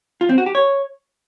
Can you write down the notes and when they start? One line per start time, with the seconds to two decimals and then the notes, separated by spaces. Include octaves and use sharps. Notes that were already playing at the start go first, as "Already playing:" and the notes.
0.21 F4
0.29 C4
0.38 F#4
0.46 G4
0.55 C#5